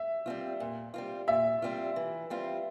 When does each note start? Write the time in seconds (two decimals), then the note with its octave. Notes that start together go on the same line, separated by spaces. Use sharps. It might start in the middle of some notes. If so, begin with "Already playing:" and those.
Already playing: E5
0.26 G3 C4 F4
0.60 A#2
0.94 G3 C4 F4
1.28 A#2 E5
1.62 G3 C4 F4
1.96 E3
2.30 G3 C4 F4